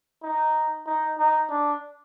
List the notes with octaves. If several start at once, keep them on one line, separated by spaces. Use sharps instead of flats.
D#4
D#4
D#4
D4